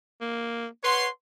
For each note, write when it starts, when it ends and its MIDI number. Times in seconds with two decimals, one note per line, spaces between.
0.21 0.67 58
0.84 1.07 71
0.84 1.08 73
0.84 1.08 78
0.84 1.08 84